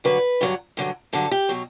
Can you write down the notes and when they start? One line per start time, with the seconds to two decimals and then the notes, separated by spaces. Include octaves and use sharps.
0.04 G2 D3 F#3 B4
0.41 G2 D3 F#3
0.77 G2 D3 F#3
1.13 G2 D3 F#3 A4
1.31 G4
1.49 B2 F#3